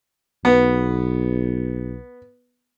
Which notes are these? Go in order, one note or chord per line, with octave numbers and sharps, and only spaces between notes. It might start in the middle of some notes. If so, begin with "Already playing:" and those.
B1 B3